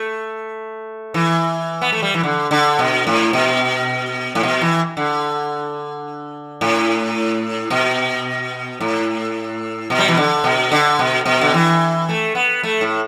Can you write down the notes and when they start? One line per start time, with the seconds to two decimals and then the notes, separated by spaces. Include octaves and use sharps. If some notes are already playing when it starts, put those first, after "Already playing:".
Already playing: A3
1.14 E3
1.82 B3
1.92 A3
2.02 G3
2.14 E3
2.23 D3
2.51 D3
2.79 B2
3.07 A2
3.33 B2
4.35 A2
4.43 B2
4.62 E3
4.97 D3
6.61 A2
7.70 B2
8.81 A2
9.90 B2
9.98 G3
10.08 E3
10.17 D3
10.44 B2
10.72 D3
10.99 B2
11.26 B2
11.41 D3
11.54 E3
12.09 A3
12.35 B3
12.63 A3
12.81 A2